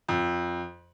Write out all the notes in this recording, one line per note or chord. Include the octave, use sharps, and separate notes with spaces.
F2